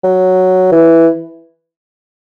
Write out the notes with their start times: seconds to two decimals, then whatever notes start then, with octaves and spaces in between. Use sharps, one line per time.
0.04 F#3
0.72 E3